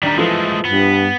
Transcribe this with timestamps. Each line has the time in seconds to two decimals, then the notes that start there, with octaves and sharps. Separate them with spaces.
0.03 D#3 G3 D4 A#5
0.18 E3 F3 G#3 A3 A4
0.65 G2 B3